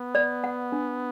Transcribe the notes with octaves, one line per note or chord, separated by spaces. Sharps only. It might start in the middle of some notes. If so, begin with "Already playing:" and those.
Already playing: B3
D5
F#5
D4